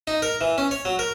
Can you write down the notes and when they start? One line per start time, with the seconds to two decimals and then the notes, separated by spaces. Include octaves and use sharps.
0.07 D#4
0.22 A#4
0.41 E3
0.58 C#4
0.71 C#5
0.85 F#3
0.99 A#4